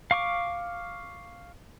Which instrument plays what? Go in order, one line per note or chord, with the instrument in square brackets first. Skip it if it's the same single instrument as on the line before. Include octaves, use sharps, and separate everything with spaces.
[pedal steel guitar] F5 C#6 D6